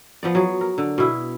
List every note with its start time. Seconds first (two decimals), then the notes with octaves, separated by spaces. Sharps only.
0.23 F3 B3 D5
0.35 F#3 G#4
0.61 A#4
0.78 D3
0.98 B2 E4 G#4